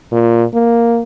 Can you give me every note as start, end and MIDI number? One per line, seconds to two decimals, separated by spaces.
0.12 0.44 46
0.54 1.03 58